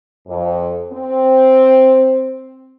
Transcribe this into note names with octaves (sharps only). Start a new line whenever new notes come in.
F2
C4